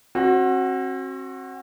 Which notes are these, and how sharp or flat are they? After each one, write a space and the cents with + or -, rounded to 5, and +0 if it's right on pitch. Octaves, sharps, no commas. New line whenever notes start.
C4 +40 F#4 +0